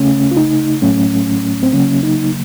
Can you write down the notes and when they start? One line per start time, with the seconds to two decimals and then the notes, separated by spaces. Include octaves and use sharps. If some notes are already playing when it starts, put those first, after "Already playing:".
Already playing: C#3 A3 C#4
0.31 F4
0.37 D#4
0.82 A2 F#3 A3 C#4
1.63 C4
1.73 C#3 F#3 A#3 C#4
2.03 D#4